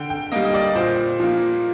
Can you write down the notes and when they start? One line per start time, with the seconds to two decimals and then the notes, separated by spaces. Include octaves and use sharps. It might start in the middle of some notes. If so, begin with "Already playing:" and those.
Already playing: D3 G5
0.10 G5
0.32 G3 A#3 D#5
0.45 D#5
0.54 D5
0.75 A#2 C5
1.20 F3 A#3